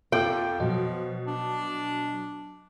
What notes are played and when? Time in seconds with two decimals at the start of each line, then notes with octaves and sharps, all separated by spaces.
0.12 F2 F4 A4 G5 D6
0.60 B2 F3 F#3 D#5
1.27 D4